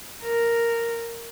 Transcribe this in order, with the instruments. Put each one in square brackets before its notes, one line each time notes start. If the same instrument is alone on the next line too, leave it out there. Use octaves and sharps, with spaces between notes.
[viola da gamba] A#4